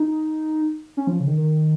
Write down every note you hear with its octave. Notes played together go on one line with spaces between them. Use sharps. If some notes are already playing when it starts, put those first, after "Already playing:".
Already playing: D#4
C#4
F3
C#3
D#3
D#3